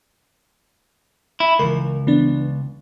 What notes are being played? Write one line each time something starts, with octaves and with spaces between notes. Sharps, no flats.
E4
C#2 E3 A#4
E3 B3 D4